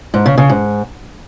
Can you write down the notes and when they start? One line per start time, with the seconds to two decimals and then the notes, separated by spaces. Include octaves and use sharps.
0.14 G#2
0.26 C#3
0.38 C#3
0.49 G#2